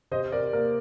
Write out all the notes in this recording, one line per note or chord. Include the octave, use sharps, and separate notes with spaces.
C3 C5 D#5
C3 A#4 D5
A#3 A#4